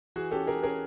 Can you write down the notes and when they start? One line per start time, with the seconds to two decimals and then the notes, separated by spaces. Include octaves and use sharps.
0.16 E3 F#4 G#4
0.31 C#4 G4 A4
0.47 C#4 G#4 A#4
0.63 C#4 G#4 A#4